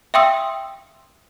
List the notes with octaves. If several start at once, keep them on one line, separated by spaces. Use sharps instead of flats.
E5 F5 G5 C6 D#6 E6